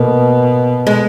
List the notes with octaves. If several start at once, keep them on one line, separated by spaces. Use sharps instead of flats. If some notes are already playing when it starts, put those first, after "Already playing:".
Already playing: B2 A#3
G#3